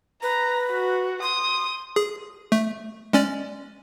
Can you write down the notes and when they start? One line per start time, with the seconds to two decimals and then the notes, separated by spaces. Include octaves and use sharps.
0.23 B4 A#5
0.71 F#4
1.22 C6 D#6
1.96 G#4
2.52 A3
3.13 G#3 C#4 D5